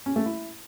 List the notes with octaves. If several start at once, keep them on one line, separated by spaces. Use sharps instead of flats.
C#4
A3
E4